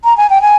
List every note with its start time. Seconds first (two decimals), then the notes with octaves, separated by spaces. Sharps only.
0.04 A#5
0.17 G#5
0.30 G5
0.41 G#5